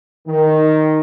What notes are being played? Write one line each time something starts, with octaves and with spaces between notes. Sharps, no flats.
D#3